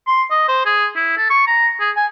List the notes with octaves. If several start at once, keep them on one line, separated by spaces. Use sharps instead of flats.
C6
D#5
C5
G#4
E4
A4
C#6
A#5
G#4
G#5